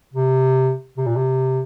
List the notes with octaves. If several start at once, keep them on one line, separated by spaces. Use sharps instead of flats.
C3
C3
A#2
C3